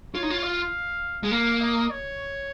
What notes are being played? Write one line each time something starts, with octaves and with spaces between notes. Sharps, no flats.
F4 C#5
D#4
F4
F5
G#3
A#3 F5
D#5
C#5